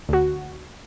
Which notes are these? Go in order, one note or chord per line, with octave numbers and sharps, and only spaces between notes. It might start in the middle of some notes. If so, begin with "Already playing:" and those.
D2 F#4